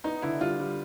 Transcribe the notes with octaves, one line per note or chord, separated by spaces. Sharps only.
B3 D#4
D3 E4
G3 F4
G3